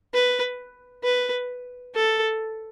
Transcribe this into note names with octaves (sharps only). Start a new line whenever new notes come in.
B4
B4
A4